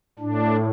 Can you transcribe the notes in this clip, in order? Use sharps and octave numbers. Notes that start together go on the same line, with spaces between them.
A2 D4